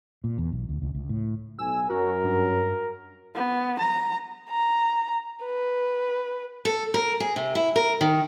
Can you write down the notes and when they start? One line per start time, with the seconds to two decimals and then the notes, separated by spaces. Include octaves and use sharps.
0.24 A#2
0.38 E2
0.52 B1
0.69 D2
0.82 C#2
0.94 C#2
1.09 A2
1.59 B1 G#5 E6
1.90 F#2 F#4 A#4
2.24 G2
3.35 B3
3.79 A#5
4.50 A#5
5.44 B4
6.65 A4
6.94 A#4
7.20 G#4
7.36 C3
7.55 E4
7.76 A#4
8.01 D#3